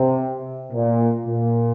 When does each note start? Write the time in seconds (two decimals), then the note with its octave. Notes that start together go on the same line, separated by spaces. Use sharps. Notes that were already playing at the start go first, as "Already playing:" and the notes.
Already playing: C3
0.72 A#2
1.26 A#2